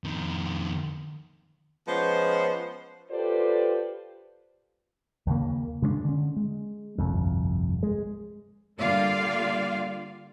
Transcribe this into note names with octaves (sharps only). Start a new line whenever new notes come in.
F2 D#3
F3 G#3 B3 C#4 C5
F4 G4 A4 B4 C5 D5
D#2 C#3 A#3
C#3 G#3 B3 D4
D3 C#4
G#3
G1 C2 F2
G#3
D3 G3 A#3 F4 D5 F5